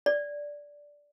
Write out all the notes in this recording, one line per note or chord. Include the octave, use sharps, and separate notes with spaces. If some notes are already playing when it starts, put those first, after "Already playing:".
D5